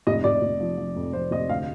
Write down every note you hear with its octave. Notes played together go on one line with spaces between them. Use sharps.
F1 D#5
F1 D5
F1
F3
F3
F2
F2 C5
F1 D#5
D2 F5